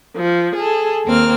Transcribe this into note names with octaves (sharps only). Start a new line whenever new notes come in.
F3
G#4 A4
D#2 A#3 C4 F6